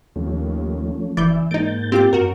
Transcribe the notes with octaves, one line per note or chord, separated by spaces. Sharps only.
D#2 F3 A3 C#4
F#1 E3 D5 E5 G6
G#2 A#3 D#4 G6 A6 D7
C4 F4 G4 D6
F#2 F#4 A#4